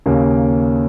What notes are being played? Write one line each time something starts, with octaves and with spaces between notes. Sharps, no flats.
D#2 C#3 A#3